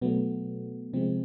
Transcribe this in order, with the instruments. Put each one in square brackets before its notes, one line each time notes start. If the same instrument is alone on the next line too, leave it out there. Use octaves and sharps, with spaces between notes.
[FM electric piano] B2 F#3 A3 B3
C3 F3 G#3 C4